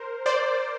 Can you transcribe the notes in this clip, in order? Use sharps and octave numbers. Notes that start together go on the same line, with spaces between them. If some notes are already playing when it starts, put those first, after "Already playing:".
Already playing: A#4 C5
C5 D5